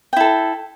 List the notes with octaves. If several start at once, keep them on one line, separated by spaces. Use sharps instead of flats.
E4 A4 G5